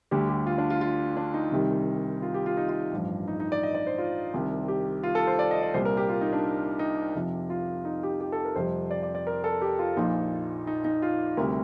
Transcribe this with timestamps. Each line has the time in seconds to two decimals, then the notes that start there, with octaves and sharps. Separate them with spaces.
0.11 D2 D3 G3 G4
0.29 G4
0.47 F4
0.58 D4
0.70 F4
0.81 F4
1.17 D4
1.34 D#4
1.52 C2 C3 D#3 G3
2.22 F4
2.34 G4
2.46 F4
2.57 D#4
2.69 F4
2.92 A1 G2 F3
3.28 D#4
3.40 D#4
3.52 D5
3.63 D#5
3.75 D5
3.86 C5
3.98 F4
4.34 C2 C3 D#3
4.68 G4
5.03 F4
5.15 A4
5.27 C5
5.39 D5
5.51 D#5
5.63 D5
5.74 C2 A#2 G3 C5
5.85 A#4
5.97 G4
6.09 F4
6.21 D#4
6.33 D4
6.79 D#4
7.15 F2 C3 F3
7.50 F4
7.85 D#4
8.03 G4
8.20 G4
8.32 A4
8.45 A#4
8.55 F2 C3 G3 C5
8.91 D5
9.03 D5
9.15 D5
9.27 A#4
9.44 A4
9.62 G4
9.79 F4
9.97 A#1 A#2 F3 D#4
10.67 D#4
10.85 D#4
11.02 F4
11.37 D2 C3 G3 A#4